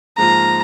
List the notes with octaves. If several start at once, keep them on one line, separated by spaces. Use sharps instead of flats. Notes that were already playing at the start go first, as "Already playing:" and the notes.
G#2 F3 A#3 F4 A#5